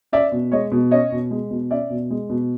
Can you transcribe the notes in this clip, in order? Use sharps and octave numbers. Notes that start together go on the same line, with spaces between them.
C#4 D5 E5
B2
G#3 C#5 D#5
B2
C#4 C#5 D#5
B2
G#3
B2
C#4 D5 E5
B2
G#3
B2